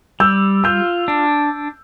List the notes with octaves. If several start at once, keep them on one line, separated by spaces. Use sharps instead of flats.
G3 E6 G6
F4 E6 G6
D4